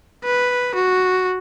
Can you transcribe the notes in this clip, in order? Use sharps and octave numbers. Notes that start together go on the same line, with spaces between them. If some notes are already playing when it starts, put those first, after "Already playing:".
B4
F#4